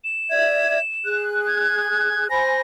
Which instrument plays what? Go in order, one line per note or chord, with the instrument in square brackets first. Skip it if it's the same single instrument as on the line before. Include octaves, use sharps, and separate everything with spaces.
[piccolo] E7
[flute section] D5 E5 G#6
G#4 F#6
[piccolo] G#6
[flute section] C5 G#5 B5 [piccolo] A#6